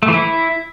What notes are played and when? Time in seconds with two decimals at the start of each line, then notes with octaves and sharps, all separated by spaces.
0.03 A3
0.08 E3
0.14 E4